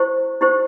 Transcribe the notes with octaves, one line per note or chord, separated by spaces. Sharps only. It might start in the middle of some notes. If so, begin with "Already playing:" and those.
Already playing: E4 G4 C5
E4 G4 C5